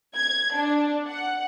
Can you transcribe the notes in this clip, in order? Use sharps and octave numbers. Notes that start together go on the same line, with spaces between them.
G#6
D4
F#5